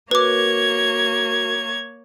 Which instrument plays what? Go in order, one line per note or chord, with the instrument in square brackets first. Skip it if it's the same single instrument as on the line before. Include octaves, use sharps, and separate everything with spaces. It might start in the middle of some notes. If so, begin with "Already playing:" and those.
[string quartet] A#3 C#5 G#6 [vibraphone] F#4 A#4 [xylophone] B4 D6